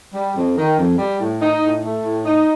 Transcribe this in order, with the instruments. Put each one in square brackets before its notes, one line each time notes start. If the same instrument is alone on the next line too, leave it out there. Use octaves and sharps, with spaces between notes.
[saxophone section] G3
F2
D#3
F2
G3
A2
D#4
A2
A3
A2
D#4